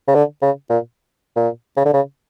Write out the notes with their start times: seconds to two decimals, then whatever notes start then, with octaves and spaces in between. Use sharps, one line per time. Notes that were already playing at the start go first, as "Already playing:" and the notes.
0.08 C#3
0.15 D3
0.42 C#3
0.70 A#2
1.36 A#2
1.77 C#3
1.85 D3
1.94 C#3